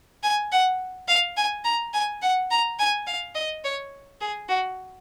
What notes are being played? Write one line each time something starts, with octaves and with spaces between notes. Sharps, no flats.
G#5
F#5
F5
G#5
A#5
G#5
F#5
A#5
G#5
F5
D#5
C#5
G#4
F#4